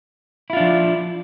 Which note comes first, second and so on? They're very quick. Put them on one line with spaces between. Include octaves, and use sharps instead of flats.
E4 F4 D4 F3